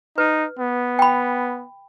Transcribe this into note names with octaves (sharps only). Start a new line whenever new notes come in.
D#4 B4
B3
G5 B5